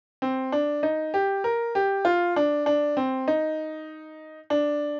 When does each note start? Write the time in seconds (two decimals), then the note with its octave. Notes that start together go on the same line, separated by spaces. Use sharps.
0.22 C4
0.52 D4
0.83 D#4
1.14 G4
1.44 A#4
1.75 G4
2.05 F4
2.36 D4
2.66 D4
2.97 C4
3.28 D#4
4.50 D4